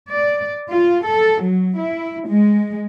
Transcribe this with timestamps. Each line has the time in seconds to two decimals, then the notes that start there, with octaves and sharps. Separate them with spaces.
0.11 D5
0.71 F4
1.06 A4
1.42 F#3
1.79 E4
2.28 G#3